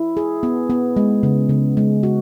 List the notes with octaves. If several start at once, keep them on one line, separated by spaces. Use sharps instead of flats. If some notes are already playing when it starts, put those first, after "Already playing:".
Already playing: E4
G#4
B3
B3
G#3
C#3
C#3
G#3
F#4